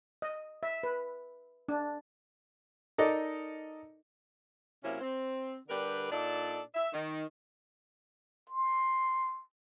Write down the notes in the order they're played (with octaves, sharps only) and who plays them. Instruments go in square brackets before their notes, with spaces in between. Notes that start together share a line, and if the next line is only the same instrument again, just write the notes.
[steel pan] D#5
E5
B4
D4
[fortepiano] D#4 A4 A#4 D5 D#5
[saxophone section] C3 F#3 A#3 C#4 E4
C4
D3 G3 D4 G4 A#4 B4
A#2 D4 D#4 A4 D5
E5
D#3
[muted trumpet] C6